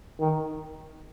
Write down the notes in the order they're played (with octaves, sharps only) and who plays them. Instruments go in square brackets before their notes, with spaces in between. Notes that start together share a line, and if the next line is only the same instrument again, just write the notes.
[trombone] D#3